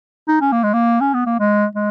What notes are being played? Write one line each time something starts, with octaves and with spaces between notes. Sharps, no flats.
D#4
C#4
A#3
G#3
A#3
C#4
B3
A#3
G#3
G#3